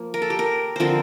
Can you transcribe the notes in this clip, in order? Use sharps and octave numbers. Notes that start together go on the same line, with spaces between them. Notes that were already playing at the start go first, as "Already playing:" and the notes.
Already playing: F3 A#3
A#4
A4
G4
A#4
D3 F3 C4 A#4 C5